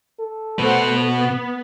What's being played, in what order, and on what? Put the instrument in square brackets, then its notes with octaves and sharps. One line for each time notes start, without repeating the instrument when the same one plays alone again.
[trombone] A4
[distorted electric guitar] B2 B4 [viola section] A3 C5 F#5
[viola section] B3